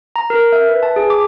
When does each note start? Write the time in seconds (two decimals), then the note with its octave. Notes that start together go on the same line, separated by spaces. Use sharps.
0.16 A#5
0.30 A#4
0.52 E5
0.69 B4
0.83 A5
0.96 G#4
1.10 D6